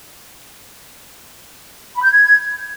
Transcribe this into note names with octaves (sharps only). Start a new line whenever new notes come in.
B5
G6
G#6